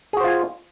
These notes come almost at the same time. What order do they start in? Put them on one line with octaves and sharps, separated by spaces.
G#4 F#4 C5 F4 G#5